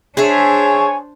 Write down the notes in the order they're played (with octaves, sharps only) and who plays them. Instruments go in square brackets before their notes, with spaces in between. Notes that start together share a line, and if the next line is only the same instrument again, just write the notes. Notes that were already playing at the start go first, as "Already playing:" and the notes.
[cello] D4 C5 [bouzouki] G#4 E5 [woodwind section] C#5 [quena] G#5